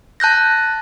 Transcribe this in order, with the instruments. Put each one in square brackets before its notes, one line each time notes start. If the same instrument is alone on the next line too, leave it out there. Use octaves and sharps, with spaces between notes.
[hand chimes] A5 F#6 G6 A#6